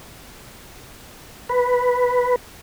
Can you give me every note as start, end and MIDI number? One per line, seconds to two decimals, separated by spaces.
1.49 2.36 71